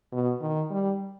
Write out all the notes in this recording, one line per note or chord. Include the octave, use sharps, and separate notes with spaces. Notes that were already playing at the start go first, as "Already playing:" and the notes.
B2
D#3
G3